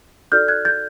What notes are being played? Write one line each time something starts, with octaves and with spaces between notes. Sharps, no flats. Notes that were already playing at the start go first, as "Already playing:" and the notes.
D#4 F#4 A4 D5 F6 G6
F#6 G#6
G6 A6